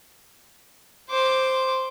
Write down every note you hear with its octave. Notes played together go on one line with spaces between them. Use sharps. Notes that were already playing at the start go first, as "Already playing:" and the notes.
C5 D6